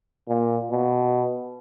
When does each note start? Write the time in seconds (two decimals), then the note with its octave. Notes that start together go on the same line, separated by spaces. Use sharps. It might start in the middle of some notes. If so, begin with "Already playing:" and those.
0.28 A#2
0.71 B2